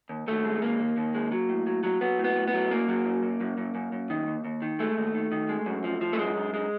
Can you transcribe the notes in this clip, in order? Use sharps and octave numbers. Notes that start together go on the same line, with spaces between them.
D#2
D#2 A3
G#3
D#2 A#3
D#2
D#2
G#3
F#3
A2
F#3
F#3
F#3 B3
A2
B3
A2
B3
F#3
F#2 A#3
F#3
F#2
F#2
F#2
F#2
F#2
F#2
D#3
D#2
D#2
D#3
G#3 A3
D#2
D#3
D#3
G#3
F#2
F3
F3
A3
F#2 G#3
F#2
G#3